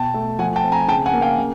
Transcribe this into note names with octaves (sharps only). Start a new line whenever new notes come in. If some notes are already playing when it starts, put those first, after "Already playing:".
Already playing: B2 G5 A5
A3
F3 F#5 G#5
G5 A5
C4
G#5 A#5
C#3 G5 A5
F#5 G#5
A#3
F5 G5
C#3